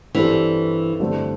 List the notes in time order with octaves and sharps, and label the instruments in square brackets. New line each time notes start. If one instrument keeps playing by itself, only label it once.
[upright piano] G2 G3 C4 A4 [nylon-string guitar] E3
[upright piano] G2 D3 A3 C4